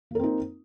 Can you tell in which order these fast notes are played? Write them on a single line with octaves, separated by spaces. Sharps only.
A#3 A#4 C4 D#4